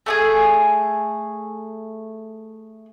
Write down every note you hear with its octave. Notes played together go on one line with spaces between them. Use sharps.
A3 D4 G#4